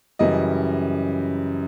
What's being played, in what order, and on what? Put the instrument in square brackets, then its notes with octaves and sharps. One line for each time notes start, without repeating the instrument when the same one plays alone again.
[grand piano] F#2 C#3 E3 G3 D#5